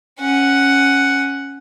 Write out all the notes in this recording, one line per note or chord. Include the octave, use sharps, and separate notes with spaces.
C#4 F#5